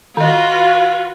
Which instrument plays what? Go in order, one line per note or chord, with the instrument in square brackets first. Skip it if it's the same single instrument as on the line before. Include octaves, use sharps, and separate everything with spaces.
[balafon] D#3 D#5 [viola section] F4 F#4 B4 [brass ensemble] F5